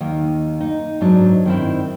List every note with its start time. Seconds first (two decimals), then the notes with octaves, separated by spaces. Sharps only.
0.01 D#2 D#3
0.61 D#4
1.01 G#2 F#3 D4
1.45 D#3 C4 E4